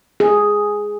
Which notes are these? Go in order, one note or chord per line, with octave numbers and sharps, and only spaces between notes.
G#4